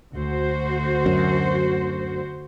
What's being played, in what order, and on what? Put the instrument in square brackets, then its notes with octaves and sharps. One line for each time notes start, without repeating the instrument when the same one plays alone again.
[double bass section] D2 [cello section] F#4 C5
[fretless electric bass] F#2